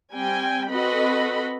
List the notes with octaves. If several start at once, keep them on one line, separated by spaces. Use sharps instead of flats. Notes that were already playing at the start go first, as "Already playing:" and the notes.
G3 C4 G5 G#5
C4 F#4 A4 B4 D#5 B5